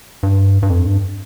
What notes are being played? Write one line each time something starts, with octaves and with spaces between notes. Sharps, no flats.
G2
G2
F2
G2